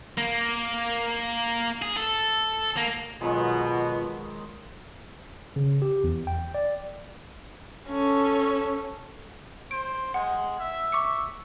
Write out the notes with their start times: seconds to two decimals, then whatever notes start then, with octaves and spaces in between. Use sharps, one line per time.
0.18 A#3
1.82 G#4
1.97 A4
2.77 A#3
3.21 B2 D#3 F#3 G#3 B3 F4
5.56 C#3
5.82 G4
6.04 E2
6.27 G5
6.54 D5
7.88 C#4 A4
9.71 C5 D7
10.14 G#3 F#5
10.59 E5
10.92 C#6 D6 C#7